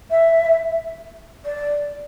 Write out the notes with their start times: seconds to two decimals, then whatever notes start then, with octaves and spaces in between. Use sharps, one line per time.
0.10 E5
1.45 D5